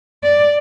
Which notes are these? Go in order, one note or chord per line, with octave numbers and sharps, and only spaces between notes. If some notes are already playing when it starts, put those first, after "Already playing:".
D5